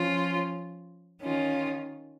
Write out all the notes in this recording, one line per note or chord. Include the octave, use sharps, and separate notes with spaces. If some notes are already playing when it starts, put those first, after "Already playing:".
Already playing: F3 C#4 F4
D#3 C#4 F4